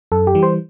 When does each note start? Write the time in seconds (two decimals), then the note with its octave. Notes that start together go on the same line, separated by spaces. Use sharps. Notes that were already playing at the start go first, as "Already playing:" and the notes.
0.12 F#2 A4
0.27 G4
0.35 E3 G3
0.43 C5